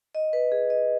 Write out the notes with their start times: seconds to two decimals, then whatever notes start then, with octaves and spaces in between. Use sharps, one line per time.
0.15 D#5
0.33 B4
0.52 G#4
0.70 D#5